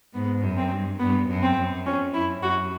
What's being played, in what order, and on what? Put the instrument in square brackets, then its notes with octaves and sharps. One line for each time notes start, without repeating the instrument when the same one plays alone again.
[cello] G#2 [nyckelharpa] B3
[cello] F#2
[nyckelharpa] C4
[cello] G2
[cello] G2 [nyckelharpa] B3
[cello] F#2
[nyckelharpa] C4
[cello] F#2
[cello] F2 [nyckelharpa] C#4
[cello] F#2 [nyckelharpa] E4
[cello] F#2 [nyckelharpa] F#4